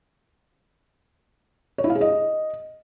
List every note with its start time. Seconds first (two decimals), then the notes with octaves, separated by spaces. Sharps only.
1.78 C#5
1.84 E4
1.90 F5
1.95 G#4
2.01 D#5